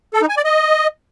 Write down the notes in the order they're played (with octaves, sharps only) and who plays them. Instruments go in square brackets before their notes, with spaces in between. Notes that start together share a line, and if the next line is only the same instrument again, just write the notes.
[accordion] A4
D#4
G#5
D5
D#5